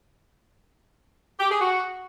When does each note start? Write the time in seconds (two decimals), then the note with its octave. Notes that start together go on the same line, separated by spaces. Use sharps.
1.39 G4
1.49 G#4
1.60 F#4